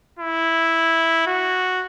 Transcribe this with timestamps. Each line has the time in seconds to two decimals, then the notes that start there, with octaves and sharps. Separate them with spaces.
0.19 E4
1.27 F#4